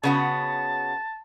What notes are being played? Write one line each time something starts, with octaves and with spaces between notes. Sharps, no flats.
C#3 B3 F#4 A5